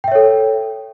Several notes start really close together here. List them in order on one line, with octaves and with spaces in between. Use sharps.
G5 E5 C#5 A4